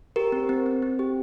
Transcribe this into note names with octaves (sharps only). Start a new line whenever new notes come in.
G4 A#4
C4
C4
C4
C4
G4